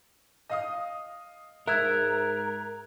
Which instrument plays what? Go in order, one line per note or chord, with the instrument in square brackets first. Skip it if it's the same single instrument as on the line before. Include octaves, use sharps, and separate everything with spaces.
[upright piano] D#5 F5 D#6
[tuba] G#2 [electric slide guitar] A#4 [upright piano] E5 E6 [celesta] F#6 G#6